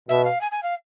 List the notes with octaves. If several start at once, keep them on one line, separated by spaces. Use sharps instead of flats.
B2 E5
F5
G#5
G#5
F5